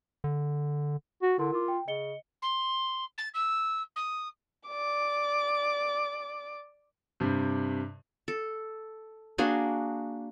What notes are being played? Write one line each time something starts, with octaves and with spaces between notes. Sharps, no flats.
D3
F#4
D3 E4 A#4 C6
F4 A#4 D6
G5
C#3 D#5 C#7 G7
C6
A6
E6
D#6
D5 D6
G2 C3
A4
A#3 D4 F#4 G#4